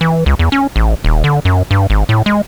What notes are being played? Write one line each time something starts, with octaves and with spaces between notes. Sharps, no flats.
E3
C#2
E2
C#4
A1
D#1
D3
F#2
G2
G#1
A2
G#3